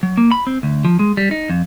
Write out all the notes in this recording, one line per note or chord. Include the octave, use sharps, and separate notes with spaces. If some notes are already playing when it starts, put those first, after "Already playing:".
F#3
A#3
B5
C4
D2
F3
G#3
G3
D#4
F2